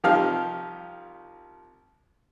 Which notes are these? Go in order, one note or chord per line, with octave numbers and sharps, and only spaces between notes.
C2 F3 D#4 G4 F5 F6